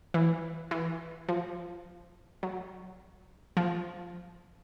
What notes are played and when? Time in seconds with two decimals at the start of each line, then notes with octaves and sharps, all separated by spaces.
0.14 E3
0.71 E3
1.29 F3
2.43 F#3
3.57 F3